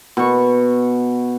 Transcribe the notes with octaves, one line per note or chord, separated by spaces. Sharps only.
B2 C#6